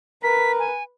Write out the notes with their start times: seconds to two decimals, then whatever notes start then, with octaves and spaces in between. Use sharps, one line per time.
0.23 A#4 B4 B6
0.59 G#5